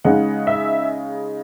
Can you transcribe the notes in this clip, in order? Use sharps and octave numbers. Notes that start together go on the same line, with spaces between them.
C#3 G#3 D#4 F#5
E5